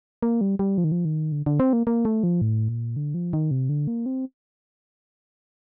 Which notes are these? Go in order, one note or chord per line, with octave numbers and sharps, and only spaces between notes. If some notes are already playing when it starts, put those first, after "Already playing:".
A#3
G3
G3
F3
D#3
F3
D#3
D3
D3
C4
A#3
A#3
A3
F3
A2
A#2
D3
F3
D#3
C3
D3
A#3
C4